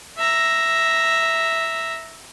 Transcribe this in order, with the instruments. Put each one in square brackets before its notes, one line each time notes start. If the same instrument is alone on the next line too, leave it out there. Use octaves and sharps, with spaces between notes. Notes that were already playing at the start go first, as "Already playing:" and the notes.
[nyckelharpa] E5 A#5